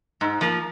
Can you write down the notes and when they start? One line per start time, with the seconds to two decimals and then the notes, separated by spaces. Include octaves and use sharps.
0.21 G#2
0.41 F3 A#3